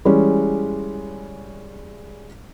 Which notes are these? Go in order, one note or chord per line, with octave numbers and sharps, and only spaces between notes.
E3 G3 G#3 C#4